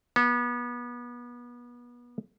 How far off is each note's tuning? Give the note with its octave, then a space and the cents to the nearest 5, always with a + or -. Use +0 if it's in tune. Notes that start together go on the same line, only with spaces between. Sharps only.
B3 -30